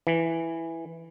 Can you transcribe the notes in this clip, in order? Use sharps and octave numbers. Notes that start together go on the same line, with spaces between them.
E3